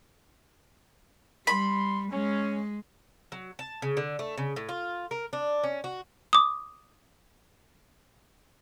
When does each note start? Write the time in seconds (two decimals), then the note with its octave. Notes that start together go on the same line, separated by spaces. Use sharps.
1.47 G3 B5 C6
2.11 G#3 C#4
3.32 F#3
3.59 A5
3.82 C#3
3.97 D3
4.19 A3
4.38 C#3
4.56 A2
4.69 F4
5.11 A#4
5.33 D4
5.64 C#4
5.84 F#4
6.33 D6 D#6